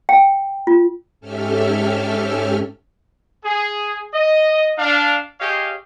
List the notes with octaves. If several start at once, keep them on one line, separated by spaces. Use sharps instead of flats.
G5
F4
G#2 C#4 G4 A4 E5 F6
G#4
D#5
D4 F5
G4 G#4 C#5 D#5 F5